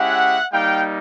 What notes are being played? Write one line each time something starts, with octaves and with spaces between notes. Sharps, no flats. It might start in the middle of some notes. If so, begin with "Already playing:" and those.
Already playing: G#3 C#4 E4 G4 E5 F#5
G3 A#3 D#4 F5 G5